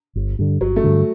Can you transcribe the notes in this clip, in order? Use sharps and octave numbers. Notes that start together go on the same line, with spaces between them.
G1
G2 D3
G1 F#3
A3
G2 D3